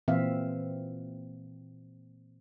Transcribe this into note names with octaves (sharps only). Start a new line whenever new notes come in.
A#2 E3 C4 E5 F5